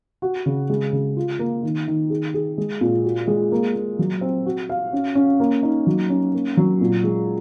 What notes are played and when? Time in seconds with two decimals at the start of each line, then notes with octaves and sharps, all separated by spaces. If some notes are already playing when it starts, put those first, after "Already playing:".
0.22 F#4
0.46 C#3
0.70 G#3
0.93 C#3
1.17 F4
1.39 A#3
1.63 D#3
1.88 D#3
2.10 G#4
2.34 G#4
2.58 G#3
2.81 A#2
3.04 F#4
3.27 G#3
3.52 A#3
3.75 A#3
3.99 F#3
4.21 C4
4.46 F#4
4.70 F5
4.93 C#4
5.15 C#4
5.40 A#3
5.63 D#4
5.87 F#3
6.10 C#4
6.33 A#3
6.57 F#3
6.81 A#2
7.04 G#3